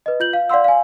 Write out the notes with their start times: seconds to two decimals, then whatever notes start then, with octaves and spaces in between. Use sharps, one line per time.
0.06 B4 D#5
0.20 F4 G6 F#7
0.33 F5
0.50 D5 F5 F#5 C6 E6
0.64 F5 G#5